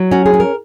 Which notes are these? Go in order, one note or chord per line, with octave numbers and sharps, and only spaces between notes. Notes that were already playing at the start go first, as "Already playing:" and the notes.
Already playing: F#3
C#4 F#4
G#4
C#4
A#4